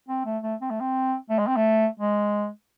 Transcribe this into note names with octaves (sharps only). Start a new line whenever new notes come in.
C4
A3
A3
C4
A3
C4
A3
G#3
C4
A3
G#3